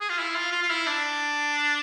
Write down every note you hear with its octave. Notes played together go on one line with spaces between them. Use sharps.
G#4
F4
E4
F4
F4
F4
E4
D4